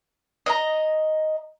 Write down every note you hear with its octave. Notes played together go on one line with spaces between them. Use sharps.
D#5 A#5